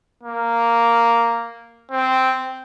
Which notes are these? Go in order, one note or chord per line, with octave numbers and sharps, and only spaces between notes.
A#3
C4